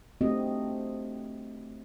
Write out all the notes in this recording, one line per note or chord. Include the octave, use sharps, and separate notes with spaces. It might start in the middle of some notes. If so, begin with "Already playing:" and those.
A3 C4 D4 F#4 G4 D#5